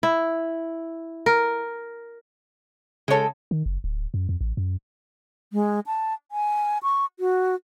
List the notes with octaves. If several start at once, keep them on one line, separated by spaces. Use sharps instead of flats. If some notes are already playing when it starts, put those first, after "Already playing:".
E4
A#4
C#3 G#3 A4 C#5
D#3
F#1
D1
F#2
F2
A1
F#2
G#3
A5
G#5
C#6
F#4